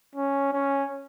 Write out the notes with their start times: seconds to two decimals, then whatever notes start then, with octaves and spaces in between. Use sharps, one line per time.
0.15 C#4
0.53 C#4